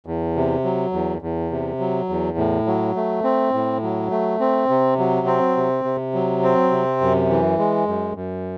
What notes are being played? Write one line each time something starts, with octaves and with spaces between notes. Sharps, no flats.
E2
C3
F#3
E2
E2
C3
F#3
E2
A2
F#3
A3
C4
A2
F#3
A3
C4
C3
F#3
C4
C3
C3
F#3
C4
C3
F#2
E3
G#3
F#2
F#2